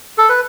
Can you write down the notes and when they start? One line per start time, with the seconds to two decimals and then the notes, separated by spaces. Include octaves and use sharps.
0.18 A4
0.29 B4